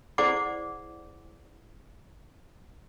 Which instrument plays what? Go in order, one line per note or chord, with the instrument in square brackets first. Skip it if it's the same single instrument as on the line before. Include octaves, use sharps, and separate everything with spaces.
[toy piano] E4 G#4 C5 D5 F#5 D6